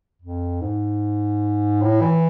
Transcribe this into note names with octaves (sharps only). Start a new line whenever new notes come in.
F2
G#2
A2
E3